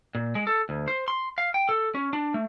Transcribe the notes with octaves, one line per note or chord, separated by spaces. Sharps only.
A#2
G#3
A4
D2
C5
C6
F5
G5
A4
C#4
D4
A3